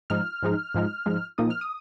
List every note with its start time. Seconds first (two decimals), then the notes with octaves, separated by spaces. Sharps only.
0.10 G#2 F3 G#3 D#4 F6
0.43 G#2 F3 G#3 D#4
0.75 G#2 F3 G#3 D#4
1.06 G#2 F3 G#3 D#4
1.38 A#2 F3 A#3 D#4 D#6
1.50 F6
1.61 D#6